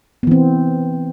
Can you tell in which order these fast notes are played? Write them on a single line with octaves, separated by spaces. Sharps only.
B3 E3 C4